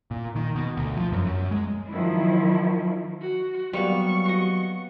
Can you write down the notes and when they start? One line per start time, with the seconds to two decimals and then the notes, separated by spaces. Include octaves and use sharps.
0.11 A#2
0.36 D#3
0.55 B2
0.77 D2
0.97 F3
1.12 F#2
1.26 F#2
1.51 G#3
1.89 D#3 F3 F#3 E4
3.21 F#4
3.73 F#3 G3 A#3 B3 C#6
4.25 F#4 D#5